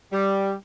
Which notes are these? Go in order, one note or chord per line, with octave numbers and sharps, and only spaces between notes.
G3